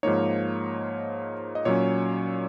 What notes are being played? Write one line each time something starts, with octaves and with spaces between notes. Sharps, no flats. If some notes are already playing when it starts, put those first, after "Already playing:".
G#2 F3 A#3 D#4 C#5
D#5
A#2 F#3 C#4 C#5